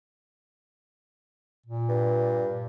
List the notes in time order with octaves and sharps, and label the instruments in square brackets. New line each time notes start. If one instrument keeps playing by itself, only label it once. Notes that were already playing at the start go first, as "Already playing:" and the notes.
[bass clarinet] A#2
[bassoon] G2